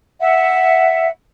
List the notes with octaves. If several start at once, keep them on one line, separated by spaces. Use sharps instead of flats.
E5 F#5